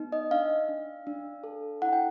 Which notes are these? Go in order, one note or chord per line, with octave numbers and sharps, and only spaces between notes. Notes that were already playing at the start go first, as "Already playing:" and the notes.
Already playing: B3 D#4
D#5
D4 F5
D4
D4
A4
E4 F#5
G5